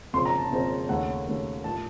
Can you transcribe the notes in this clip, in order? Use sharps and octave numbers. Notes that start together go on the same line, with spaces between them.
F#1 F2 C#3 F3 C4 C6
A#5
A5
F#1 F2 C#3 F3 C4
D#2 C#3 A3 C#4 F#5
D#2 C#3 A3 C#4
A2 F3 A5